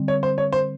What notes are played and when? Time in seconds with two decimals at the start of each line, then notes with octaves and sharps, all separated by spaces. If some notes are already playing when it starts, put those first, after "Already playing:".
Already playing: D3 G3 C4
0.08 C#5
0.23 C5
0.38 C#5
0.52 C5